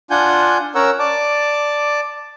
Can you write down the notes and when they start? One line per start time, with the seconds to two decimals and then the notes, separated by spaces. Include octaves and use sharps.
0.11 D4 F4 F#5 G#5 G6
0.75 C#4 A#4 C#5 F#5 A#5 E6
0.99 D5 A5 D6